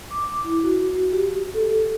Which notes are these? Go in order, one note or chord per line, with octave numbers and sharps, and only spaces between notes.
D6
E4
F#4
G4
A4